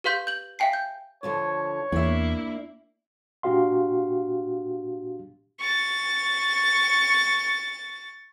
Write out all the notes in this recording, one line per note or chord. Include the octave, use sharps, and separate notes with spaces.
G4 B4 F5 C6 G6
G6 F#7
E5 F5 G5 G#5 C7
G6
D2 D3 F3 C#5
E2 A#3 D4 E4 E5
A#2 D4 F#4 G4 F5 C6
C#6 A6